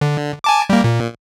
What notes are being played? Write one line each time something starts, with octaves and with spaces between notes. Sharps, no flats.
D3
G#5 A5 D6
G3 A#3
A#2